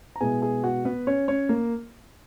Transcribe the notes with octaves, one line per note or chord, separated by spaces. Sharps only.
A#5
B2 G#3 B3 E4 G#4 G#5
G#4 G#5
F#4 F#5
B3 B4
C#4 C#5
C#4 C#5
A#3 A#4